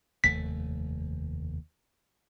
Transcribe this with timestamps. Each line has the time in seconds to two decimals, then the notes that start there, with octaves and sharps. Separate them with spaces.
0.24 F1 D#2 A3 B6